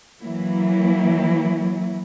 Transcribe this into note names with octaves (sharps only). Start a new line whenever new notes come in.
E3 F#3 A#3 E4